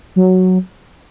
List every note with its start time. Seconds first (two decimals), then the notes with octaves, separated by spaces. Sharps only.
0.16 F#3